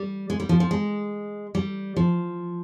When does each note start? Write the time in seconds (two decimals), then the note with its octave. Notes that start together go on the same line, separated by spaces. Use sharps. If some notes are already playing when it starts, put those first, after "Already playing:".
Already playing: G3
0.30 G#3
0.40 G3
0.49 F3
0.60 F3
0.71 G#3
1.55 G3
1.96 F3